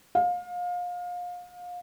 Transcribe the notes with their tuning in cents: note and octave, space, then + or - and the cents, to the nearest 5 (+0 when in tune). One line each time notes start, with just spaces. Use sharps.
F5 +30